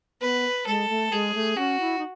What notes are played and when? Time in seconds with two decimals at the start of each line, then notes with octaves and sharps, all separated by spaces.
0.21 B3 B4
0.66 G#3 A4
0.89 A3
1.12 G#3 G#4
1.35 A3
1.57 C#4 F#4
1.80 E4
1.98 D#4